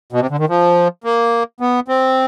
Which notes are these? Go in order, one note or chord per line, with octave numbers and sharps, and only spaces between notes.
B2
C3
D3
D#3
F3
A#3
B3
C4